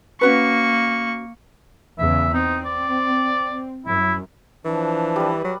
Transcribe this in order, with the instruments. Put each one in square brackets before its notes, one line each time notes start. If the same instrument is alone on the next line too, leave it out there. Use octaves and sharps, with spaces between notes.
[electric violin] A#3 C#6 [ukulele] C#4 F#4 B4
[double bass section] E2 C#3 [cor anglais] E5
[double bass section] C4 [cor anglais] D#4
[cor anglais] D5
[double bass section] F#2 [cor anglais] E4
[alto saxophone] E3 [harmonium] F3 D4
[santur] G3 B4
[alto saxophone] F#3